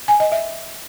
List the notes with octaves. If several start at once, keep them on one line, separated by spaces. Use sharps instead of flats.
G#5
D#5
E5